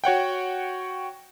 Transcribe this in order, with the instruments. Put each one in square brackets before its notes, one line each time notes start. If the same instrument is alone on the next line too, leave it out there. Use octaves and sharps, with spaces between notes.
[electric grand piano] F#4 C#5 F#5 G5